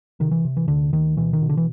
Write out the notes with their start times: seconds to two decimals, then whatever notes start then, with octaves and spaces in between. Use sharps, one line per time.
0.20 C3 D#3
0.31 E3
0.44 C3
0.57 E3
0.68 D2 D3
0.92 D2 D#3
1.17 B2 E3
1.33 D#3
1.42 B2
1.49 D3
1.57 E3